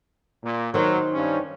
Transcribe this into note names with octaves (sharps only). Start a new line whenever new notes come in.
A#2
D#3 F#3 C5
G2 C#4